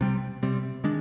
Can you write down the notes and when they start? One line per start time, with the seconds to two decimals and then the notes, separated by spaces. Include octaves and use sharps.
0.01 C3 G3 C4
0.43 C3 G3 C4
0.84 D#3 G#3 D4